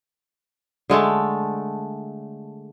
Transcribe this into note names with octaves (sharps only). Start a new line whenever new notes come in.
D3 G#3 A3 A4